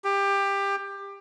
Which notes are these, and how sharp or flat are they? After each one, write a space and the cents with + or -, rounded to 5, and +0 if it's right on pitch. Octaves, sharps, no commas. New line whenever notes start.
G4 +20